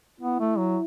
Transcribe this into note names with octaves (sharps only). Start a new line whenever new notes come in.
B3 E4
A3
F#3